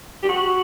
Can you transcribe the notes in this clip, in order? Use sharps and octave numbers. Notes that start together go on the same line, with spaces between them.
G4
F#4